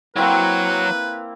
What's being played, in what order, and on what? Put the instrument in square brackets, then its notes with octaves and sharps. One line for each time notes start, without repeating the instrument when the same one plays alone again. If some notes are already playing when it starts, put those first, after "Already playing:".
[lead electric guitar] F#3 F#4 [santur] A#3 C4 E4 [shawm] B4